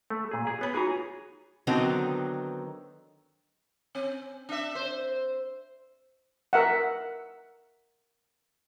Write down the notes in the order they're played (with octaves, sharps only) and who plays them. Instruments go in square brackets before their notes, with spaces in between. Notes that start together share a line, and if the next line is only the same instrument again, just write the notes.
[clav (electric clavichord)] A3
A#2 G#4
G#4
[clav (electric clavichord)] B3 [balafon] C#5 B5
[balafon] D#4 F4 F#4 [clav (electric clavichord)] G#4 G#5 A#5
[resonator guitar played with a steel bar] D3 D#3 F#3 B3 C4 D#4
[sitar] C4
D4 E5
C5
[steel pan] A#4 E5 F#5